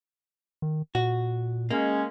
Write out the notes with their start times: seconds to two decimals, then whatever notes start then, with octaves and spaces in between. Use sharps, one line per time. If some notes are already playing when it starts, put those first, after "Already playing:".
0.62 D#3
0.95 A#2 F#4
1.71 G#3 A#3 C#4